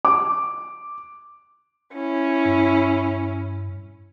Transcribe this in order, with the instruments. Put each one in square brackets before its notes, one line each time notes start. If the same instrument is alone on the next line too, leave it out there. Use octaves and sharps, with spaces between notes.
[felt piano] D6
[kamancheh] C#4 E4
[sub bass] G2